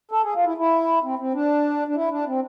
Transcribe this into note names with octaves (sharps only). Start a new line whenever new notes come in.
A4
G#4
F4
E4
E4
C4
C4
D4
D4
E4
D4
C4